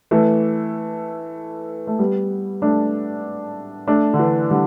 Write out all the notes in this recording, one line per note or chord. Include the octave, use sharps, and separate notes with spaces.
E3 A3
A3
G3 B3
A3 D4
A3 D4
D3
E3
D3 G3